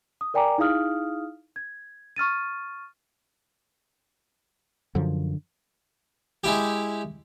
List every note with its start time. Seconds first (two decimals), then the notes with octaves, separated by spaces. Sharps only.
0.21 D#6
0.34 A#4 D5 G5 G#5 A#5 D6
0.58 D#4 E4 G#4 F5 D#6 F6
1.56 G#6
2.16 C#6 F6 A6 D#7
4.95 F#2 D3 F3
6.44 G#3 E4 G4